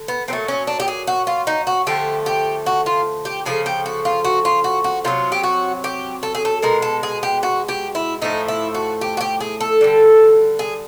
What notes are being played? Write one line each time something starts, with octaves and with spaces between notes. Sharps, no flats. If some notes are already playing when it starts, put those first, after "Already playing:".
Already playing: D3
B3
A#2 F#3 A3 C4
C#4
D4
G4
G#4
F#4
F4
D#4
F#4
D3 F3 A3 G4
G4
F#4
F4
G4
C#3 F3 A3 G#4
G4
F#4
F4
F#4
F4
F#4
F#4
C3 D#3 F#3 F4
G4
F#4
G4
A4
G#4
A4
B2 G#3 A#4
A4
G#4
G4
F#4
G4
E4
A2 F3 A3 D#4
E4
F#4
G4
F#4
G4
G#4
A4
D3 G3
G#4